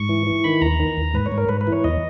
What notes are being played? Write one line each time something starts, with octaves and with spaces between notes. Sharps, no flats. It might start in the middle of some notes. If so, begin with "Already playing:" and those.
Already playing: G#2 C#6
E3
E3
D#3 B5
D#2 A#5
D#3
D#2
G#2 B4
C#5
G#2
A#4
G#2 B4
B4
E3
C#5
E2 D#5